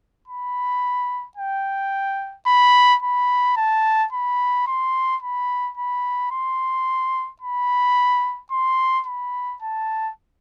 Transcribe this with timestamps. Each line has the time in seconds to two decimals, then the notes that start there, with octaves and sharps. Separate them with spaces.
0.28 B5
1.37 G5
2.47 B5
3.02 B5
3.57 A5
4.13 B5
4.67 C6
5.22 B5
5.77 B5
6.32 C6
7.42 B5
8.52 C6
9.06 B5
9.62 A5